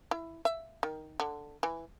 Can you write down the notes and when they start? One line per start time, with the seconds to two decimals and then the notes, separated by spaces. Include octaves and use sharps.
0.11 E4
0.45 E5
0.83 D#3
1.20 D3
1.63 E3